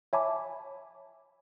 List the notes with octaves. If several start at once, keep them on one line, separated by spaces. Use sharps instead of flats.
C#5 E5 G#5 A5 B5 D6